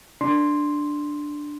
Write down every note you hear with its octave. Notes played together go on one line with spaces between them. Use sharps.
D4 C6